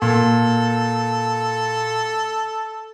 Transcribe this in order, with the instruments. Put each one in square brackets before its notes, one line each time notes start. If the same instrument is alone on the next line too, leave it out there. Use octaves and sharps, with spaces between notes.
[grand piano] A#2 [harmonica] A4